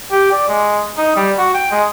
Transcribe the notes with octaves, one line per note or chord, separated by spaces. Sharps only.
G4
D5
G#3
D#4
G3
F#4
G5
G#3